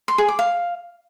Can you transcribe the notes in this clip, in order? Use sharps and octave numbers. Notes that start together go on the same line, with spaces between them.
C6
G#4
D6
F5